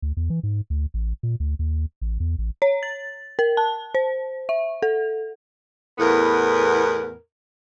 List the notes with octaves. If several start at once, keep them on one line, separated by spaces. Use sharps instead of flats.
D2
E2
E3
G#2
D2
A1
A#2
D2
D#2
A1
E2
A1
C#5
A6
A#4
A5
C5
E5
A4
E2 A2 B3 A#4 B4